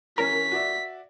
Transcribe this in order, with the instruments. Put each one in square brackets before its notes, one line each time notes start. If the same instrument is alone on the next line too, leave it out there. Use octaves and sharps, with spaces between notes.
[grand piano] E3 C#4 [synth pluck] A#4 [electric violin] B6
[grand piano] F#4 D5 E5